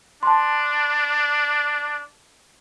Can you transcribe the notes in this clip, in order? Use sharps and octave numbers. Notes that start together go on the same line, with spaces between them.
D4 A5 C6